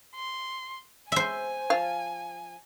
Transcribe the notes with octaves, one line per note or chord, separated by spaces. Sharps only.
C6
C5 E5 G#5
F3 F5